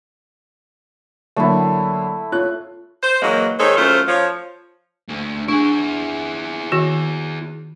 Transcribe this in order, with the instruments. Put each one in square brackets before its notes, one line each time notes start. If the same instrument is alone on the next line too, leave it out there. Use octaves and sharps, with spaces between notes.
[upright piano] D3 F#3 A#3 [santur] A3 E4
[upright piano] F4 C#5 F#6
[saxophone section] C5
E3 F#3 G#3 A#3
D#3 G#3 A4 C5 C#5
F#2 A3 F4 C5
F3 C#5
[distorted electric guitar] D2 A3
[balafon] D4 [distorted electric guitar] E4 G#4
[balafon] D#3 F#4